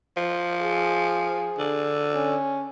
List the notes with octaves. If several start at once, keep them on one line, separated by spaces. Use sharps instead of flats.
F3
G#4
D3
C#4